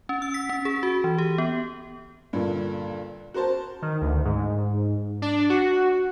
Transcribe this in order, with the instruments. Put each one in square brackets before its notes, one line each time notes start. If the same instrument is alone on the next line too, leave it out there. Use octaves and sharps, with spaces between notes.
[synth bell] C#4
E6
B6
C#4
G#4
F#4
E3
G4
B3
[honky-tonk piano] G2 A#2 D3
F#4 A#4 C5 A5
[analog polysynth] D#3
D2
G#2
D4
F#4